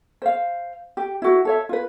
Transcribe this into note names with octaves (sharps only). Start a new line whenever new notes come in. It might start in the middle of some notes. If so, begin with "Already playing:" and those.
C5 F5
G4
E4 F#4
A4 C#5 E5
F4 B4